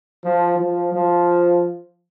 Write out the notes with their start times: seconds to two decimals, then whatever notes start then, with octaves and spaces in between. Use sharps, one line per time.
0.24 F3
0.58 F3
0.93 F3